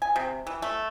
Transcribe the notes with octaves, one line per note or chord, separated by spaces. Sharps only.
G#5
C3
E3
A3